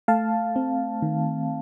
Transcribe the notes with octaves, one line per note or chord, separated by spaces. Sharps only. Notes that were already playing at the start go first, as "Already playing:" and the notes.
A3 F5 A5
C4
D#3